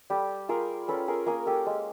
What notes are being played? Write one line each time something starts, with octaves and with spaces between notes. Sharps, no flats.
G3 G4 A4
F4 G#4 A#4
C#4 A4 B4
G#4 A#4
A#3 G#4 A#4
G4 A4
G#3